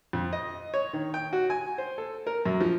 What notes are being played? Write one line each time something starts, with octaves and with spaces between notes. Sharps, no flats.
F2
D#5
C#5
D#3
G5
F#4
G#5
C5
A4
A#4
F#2
F3